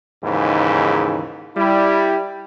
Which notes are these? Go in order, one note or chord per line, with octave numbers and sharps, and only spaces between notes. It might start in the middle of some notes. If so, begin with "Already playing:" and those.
D#2 G#2 C#3 E3
G3 E4